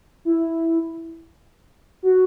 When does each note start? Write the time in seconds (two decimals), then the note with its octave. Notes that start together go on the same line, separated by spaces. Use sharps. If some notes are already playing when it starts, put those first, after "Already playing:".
0.25 E4
2.03 F#4